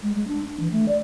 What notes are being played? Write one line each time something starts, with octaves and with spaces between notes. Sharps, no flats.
G#3
G#3
D4
D4
E3
A3
D5